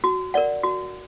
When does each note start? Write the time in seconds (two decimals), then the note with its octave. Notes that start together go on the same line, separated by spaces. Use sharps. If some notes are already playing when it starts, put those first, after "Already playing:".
0.04 F#4
0.34 A#4 D5 F#5
0.63 F#4